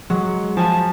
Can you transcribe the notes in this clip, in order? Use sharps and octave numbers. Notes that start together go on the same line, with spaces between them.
F#3 G#3
F3 G#5 A5